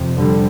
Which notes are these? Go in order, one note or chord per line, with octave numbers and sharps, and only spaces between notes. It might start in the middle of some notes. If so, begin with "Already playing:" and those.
Already playing: F2 C3
D3 G3